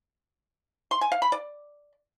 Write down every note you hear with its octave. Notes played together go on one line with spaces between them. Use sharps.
C6
G#5
F5
B5
D5